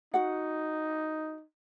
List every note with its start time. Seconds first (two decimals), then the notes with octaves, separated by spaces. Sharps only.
0.14 D#4 F#4 F#5